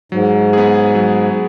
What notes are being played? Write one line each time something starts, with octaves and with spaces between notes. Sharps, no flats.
G#2 F#3
B3 G#4
F#3